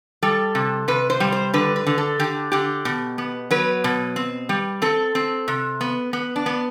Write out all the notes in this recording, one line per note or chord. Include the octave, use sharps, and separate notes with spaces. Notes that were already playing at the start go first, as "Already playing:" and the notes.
G3 A4
C3
C3 B4
C5
G3
C5
D3 B4
B4
D3
A4
D3 G4
D3 G4
B2
B3
F#3 B4
B2
C4
G3
C4 A4
C4
C3
B3
B3
D4
B3